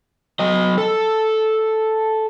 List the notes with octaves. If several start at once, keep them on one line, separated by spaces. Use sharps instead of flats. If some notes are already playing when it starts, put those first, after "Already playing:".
F#3 D#5
A4